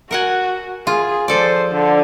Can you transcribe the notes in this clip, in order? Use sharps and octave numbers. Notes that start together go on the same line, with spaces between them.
F#4 A#4 F#5 G#5
F4 G#4
F3 A4 C5 D5
D3